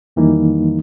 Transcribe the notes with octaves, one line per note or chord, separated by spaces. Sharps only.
F2 D#3 E3 G3 A#3 D#4